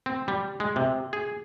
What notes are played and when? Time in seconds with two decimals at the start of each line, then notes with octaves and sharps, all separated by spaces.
0.06 C4
0.28 G3
0.60 G#3
0.76 C3
1.13 G#4